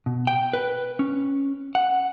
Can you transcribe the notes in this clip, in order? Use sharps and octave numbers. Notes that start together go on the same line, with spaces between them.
B2
G5
B4
C#4
F#5